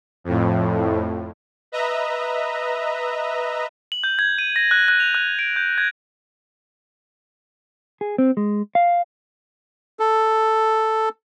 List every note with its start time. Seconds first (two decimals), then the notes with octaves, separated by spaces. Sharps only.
0.24 F2 A2
1.72 B4 D#5 E5 A#5
3.92 F#7
4.04 G6
4.19 G#6
4.38 D#7
4.56 A#6
4.71 F#6
4.88 F#6
5.00 F7
5.15 F#6
5.39 D7
5.56 G6
5.78 G#6
8.01 G#4
8.18 C4
8.37 G#3
8.75 F5
10.00 A4